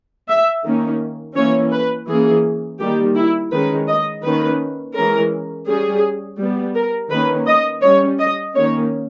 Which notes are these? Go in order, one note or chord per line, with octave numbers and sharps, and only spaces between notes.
E5
D#3 A#3 C#4
E3 A#3 C#4 C#5
B4
E3 A#3 C#4 G#4
D#3 G3 A#3 G4
E4
D#3 G#3 C#4 B4
D#5
D#3 A#3 C#4 B4
E3 G#3 C#4 A#4
G3 C#4 G#4
G3 B3
A#4
D#3 A#3 C#4 B4
D#5
G3 C#4 C#5
D#5
D#3 A#3 C#4 C#5